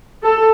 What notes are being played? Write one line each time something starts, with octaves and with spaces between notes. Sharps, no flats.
A4